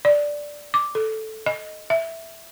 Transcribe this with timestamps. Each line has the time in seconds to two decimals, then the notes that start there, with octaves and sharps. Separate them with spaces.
0.05 D5
0.74 D6
0.95 A4
1.46 D#5
1.90 E5